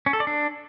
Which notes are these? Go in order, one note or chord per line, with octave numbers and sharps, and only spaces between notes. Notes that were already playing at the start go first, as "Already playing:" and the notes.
C#4
A4
D5
D4